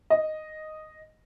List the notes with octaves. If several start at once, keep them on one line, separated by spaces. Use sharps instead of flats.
D#5